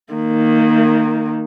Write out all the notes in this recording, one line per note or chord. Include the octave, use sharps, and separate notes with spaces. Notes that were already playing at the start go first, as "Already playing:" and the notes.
D#3 A#3